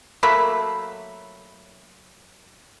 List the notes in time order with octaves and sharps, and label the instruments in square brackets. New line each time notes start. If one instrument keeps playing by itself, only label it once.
[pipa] F#3 A3 A#3 B5